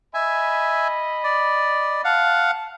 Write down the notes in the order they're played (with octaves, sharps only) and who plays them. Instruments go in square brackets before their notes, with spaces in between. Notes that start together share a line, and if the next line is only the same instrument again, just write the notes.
[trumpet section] D#5 B5 [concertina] E5 G#5
[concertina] D5
[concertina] F5 F#5 [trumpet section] A5